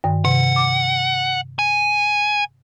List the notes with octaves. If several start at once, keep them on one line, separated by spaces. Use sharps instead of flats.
G2 D#3
C3 F#5
D6
G#5